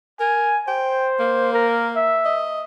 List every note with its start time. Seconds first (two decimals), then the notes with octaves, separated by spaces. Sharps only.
0.20 A#4 G#5
0.68 C5 G5
1.20 A#3
1.53 A#4
1.96 E5
2.25 D#5